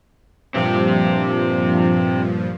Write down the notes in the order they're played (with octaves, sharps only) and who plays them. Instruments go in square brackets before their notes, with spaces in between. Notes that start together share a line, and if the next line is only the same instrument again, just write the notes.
[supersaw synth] G2 A#2 F3 [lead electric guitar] C4 G4